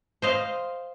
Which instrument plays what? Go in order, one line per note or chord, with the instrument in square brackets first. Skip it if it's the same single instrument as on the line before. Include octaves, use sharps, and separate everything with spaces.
[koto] C5 D#5 F5